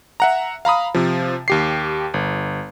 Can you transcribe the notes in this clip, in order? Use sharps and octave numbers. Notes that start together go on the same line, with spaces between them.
E5 F#5 A#5
F5 A#5 B5 D#6
C3 F3
D#2 G4 C7
G1